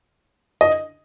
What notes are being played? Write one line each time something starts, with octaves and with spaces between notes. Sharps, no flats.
D#5